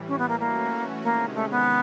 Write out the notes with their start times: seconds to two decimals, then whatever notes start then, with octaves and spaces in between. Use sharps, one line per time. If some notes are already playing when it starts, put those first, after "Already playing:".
Already playing: A2 E3 G3
0.08 C#4
0.19 B3
0.29 A#3
0.40 E3 A3 A#3 C#4 F#4
1.03 C3 D#3 G#3 A#3 C#4
1.34 A3
1.51 B3